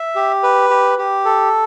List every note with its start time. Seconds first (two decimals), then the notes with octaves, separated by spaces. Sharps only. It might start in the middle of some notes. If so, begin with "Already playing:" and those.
Already playing: E5
0.16 G4
0.43 B4
0.70 G4
0.98 G4
1.25 A4